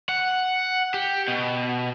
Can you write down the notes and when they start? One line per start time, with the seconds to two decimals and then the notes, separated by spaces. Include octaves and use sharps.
0.09 F#5
0.94 G4
1.28 B2